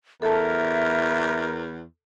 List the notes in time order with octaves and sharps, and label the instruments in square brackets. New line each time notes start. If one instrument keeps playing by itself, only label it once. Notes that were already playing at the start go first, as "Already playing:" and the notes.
[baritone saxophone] E2 [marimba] A4 A5 [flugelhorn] A#4 [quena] E5